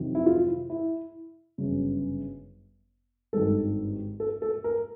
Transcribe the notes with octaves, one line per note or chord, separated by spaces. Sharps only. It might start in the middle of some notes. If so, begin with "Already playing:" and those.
Already playing: F2 C3 D#3 F#3
E4
F4
E4
G1 F#2 C#3
G#1 G2 D#3 A4
A4
A4
A#4